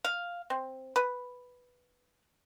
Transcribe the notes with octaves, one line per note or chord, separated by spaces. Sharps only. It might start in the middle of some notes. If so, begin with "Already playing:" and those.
F5
C4
B4